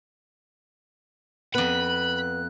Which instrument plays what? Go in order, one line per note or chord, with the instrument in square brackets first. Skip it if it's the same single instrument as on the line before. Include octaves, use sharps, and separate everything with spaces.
[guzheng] F2 B4 [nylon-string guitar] B3 [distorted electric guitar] B5 [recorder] F#6